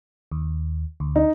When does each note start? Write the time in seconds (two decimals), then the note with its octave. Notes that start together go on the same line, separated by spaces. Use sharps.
0.32 D#2
1.00 D2
1.16 D#4